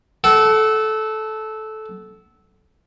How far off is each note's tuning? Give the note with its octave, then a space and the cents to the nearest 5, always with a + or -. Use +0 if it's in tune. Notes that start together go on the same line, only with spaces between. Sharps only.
A4 -15 F#5 +30